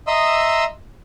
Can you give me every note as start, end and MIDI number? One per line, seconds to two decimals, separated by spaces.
0.07 0.65 75
0.07 0.65 76
0.07 0.65 82
0.07 0.65 84
0.07 0.65 87
0.07 0.65 88